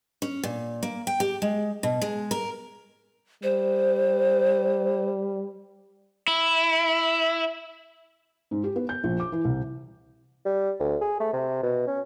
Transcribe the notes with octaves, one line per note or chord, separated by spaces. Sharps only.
C#4
A#2
A#3
G5
G4
G#3
B2
G#3
A#4
G3 C5
E4
G#2
G4
B3
G6
A#1
D6
E3
C2
G3
D2
G#4
A3
C3
B2
C#4